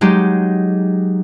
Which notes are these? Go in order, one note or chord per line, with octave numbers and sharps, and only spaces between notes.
F#3 G#3 D#4 G4